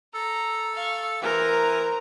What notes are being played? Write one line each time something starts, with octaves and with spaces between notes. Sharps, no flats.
A4 A#5
F5 C#6
E3 A#4 C5 A#5